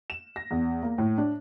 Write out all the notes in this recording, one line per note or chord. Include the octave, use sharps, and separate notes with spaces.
E7
A#6
E2
A#3
A2
D4